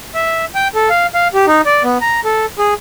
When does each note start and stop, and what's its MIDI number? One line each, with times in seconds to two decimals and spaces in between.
0.14 0.45 76
0.55 0.68 79
0.75 0.89 69
0.90 1.07 77
1.14 1.28 77
1.34 1.46 67
1.47 1.61 63
1.66 1.83 74
1.83 1.98 59
2.01 2.20 82
2.24 2.46 69
2.59 2.74 68